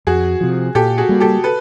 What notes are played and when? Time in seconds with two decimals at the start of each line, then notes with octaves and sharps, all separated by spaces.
0.07 F2 F#4 G#4
0.41 C3 F3
0.75 A#2 G4 A4
0.98 F#4 G#4
1.09 G3 A#3
1.20 G4 A4
1.44 A4 B4